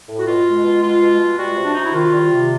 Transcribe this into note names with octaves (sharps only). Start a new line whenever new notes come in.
A2
F#4
B2 F4
G#3
B2
G#3 F4
B2
G#3
G3 F#4
C3
D4
C3 D#4
E4
D#3 F4
G3
C3